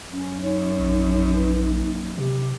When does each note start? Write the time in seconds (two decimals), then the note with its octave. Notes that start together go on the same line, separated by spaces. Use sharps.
0.11 F#2 C#4
0.42 D#4 C#5
0.80 A#1
1.34 B4
1.70 A#3
2.18 C3 G4